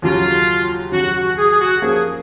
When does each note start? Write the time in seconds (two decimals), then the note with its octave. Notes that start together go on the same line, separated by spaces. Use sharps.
0.02 D#2 C#3 F#3 C#4 F4
0.92 D#2 C#3 F#3 C#4 F#4
1.14 F#4
1.37 G#4
1.50 G#4
1.59 F#4
1.82 F3 A#3 C#4 F4 G#4